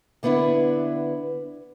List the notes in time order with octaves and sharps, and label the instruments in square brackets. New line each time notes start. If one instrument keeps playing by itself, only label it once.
[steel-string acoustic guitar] D3 B3 D4 E4 B4